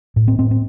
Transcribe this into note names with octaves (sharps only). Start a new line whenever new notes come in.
A2
C4
A2 C4
C4